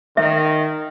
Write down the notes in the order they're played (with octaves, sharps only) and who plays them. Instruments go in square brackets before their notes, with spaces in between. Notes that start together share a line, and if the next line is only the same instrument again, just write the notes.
[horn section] D#3 [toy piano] E5